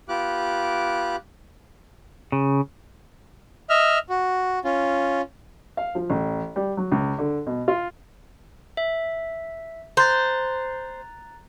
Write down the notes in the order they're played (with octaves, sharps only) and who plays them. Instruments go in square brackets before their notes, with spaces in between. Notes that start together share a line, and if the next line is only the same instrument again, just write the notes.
[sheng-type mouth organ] B3 F4 G4 D6 F#6
[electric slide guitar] C#3
[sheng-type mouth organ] D#5 E5 F6
F#4
C#4 F4
[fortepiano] F5
F3
A1
G3
F#3
C#2
D3
B2
F4
[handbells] E5
[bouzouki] C5 [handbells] A#5 F#6 A6